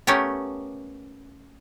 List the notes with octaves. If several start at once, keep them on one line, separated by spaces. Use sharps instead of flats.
A3 B3 C#4 G4 A#4